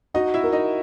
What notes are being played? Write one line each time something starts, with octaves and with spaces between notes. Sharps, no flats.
D#4 F#4 D#5
E4 E5
A#4
D#4 D#5